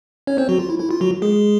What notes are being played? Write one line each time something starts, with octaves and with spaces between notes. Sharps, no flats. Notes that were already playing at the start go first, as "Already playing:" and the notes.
C#4 C#5
C4 C5
F#3 F#4
F4
E4
E4
F4
F#3 F#4
G#3 G#4